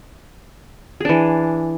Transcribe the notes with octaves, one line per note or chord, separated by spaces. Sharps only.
E3 D4 G#4